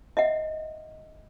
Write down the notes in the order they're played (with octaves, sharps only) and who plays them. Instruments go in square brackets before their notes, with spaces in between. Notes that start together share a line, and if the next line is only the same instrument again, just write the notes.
[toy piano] D#5 E5 F#5